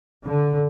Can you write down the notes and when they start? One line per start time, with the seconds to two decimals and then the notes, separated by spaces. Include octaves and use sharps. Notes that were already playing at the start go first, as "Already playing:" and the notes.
0.25 D3